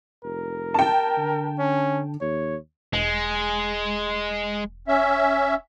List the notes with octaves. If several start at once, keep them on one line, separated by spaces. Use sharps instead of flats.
F1 A#4
G5 A5
D3
C#4
D#2 C#5
E1 G#3
C#4 E5